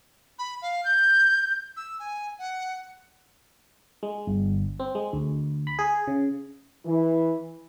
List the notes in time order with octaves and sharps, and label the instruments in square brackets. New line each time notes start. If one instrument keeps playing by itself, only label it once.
[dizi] B5
F5
G6
E6
G#5
F#5
[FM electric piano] G#3
G1
C4
G#3
D2
B5
G#4
C#3
[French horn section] E3